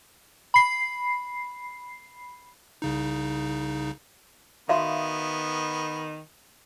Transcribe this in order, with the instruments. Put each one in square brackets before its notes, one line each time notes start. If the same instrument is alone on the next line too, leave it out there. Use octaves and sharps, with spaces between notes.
[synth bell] B5 C7
[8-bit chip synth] C2 C#3 D#4
[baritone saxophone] D#3 [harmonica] B3 [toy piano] F#4 E5 F5